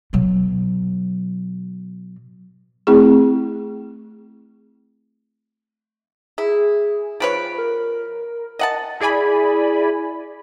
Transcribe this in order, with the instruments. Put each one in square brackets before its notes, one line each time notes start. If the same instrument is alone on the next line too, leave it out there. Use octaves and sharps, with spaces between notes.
[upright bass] B2 F#3
[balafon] A3 C4 E4 G#4
[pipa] E4 [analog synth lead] G#4
[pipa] F3 B4 C#5 [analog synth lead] D7
[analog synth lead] A#4
[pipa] D#5 F#5 A5
[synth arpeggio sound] E4 G#4 D5 G#5 B5